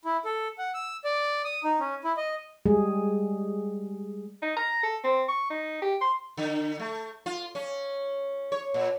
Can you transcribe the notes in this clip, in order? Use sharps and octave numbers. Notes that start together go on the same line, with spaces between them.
E4
A4
F#5
E6
D5
D#6
D#4
C#4
E4
D#5
G3 G#3 G#4
D#4
A#5
A4
C4
C#6
D#4
G4
C6
D3
A3
F4
C#4
C#5
A#2